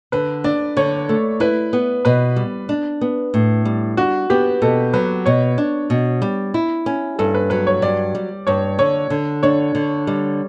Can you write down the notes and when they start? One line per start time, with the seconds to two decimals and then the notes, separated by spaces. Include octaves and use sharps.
0.12 D3 B4
0.44 D4 D5
0.77 D3 C#5
1.09 A3
1.40 E4 B4
1.73 B3
2.05 B2 B4
2.36 G3
2.69 D4
3.01 B3
3.34 A2
3.65 G3
3.97 D4 F#4
4.30 B3 G4
4.62 B2 A4
4.93 F#3 B4
5.26 B2 C#5
5.58 D4
5.90 B2
6.22 G3
6.54 E4
6.86 C#4
7.19 G2 A4
7.35 B4
7.50 F#3 B4
7.67 C#5
7.82 G2 D5
8.15 G3
8.47 G2 C#5
8.79 D3 C#5
9.10 D3
9.43 D4 C#5
9.75 D3
10.07 G3